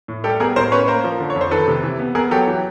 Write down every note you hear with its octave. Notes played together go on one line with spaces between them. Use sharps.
A2
G3 G4 A4
B3 G#4 A#4
A2 A#4 C5
C#4 B4 C#5
A#3 A#4 C5
F3
D3
C#5
F2
C5
D#3 A4 B4
C3
E3
B3
B3 G#4 A#4
F#3 G4 A4
E3